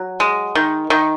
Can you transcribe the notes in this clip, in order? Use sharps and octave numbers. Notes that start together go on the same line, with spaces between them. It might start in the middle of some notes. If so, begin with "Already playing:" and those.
Already playing: F#3
G#3
D#3
D#3